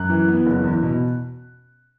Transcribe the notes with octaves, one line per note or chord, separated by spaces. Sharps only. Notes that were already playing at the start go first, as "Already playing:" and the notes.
Already playing: F#2 F#6
E3
B3
F#1
E2
B2